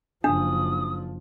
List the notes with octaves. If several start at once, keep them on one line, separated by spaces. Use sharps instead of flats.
F#1 F3 D4 D#6